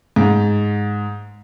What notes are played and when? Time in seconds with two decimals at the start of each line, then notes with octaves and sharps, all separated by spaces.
0.16 G#2